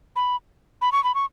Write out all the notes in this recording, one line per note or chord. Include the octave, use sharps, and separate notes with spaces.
B5
B5
C#6
B5
C#6